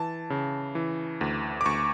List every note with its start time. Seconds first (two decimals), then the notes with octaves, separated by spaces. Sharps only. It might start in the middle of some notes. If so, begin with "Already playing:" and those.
Already playing: E3 A5
0.30 C#3
0.75 E3
1.21 D2
1.61 D6
1.66 D2 C#6